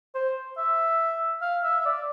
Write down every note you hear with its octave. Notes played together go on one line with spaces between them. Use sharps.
C5
E5
F5
E5
E5
D5